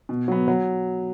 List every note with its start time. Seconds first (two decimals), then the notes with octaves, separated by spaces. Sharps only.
0.09 B2
0.28 F#3 B3
0.48 F#3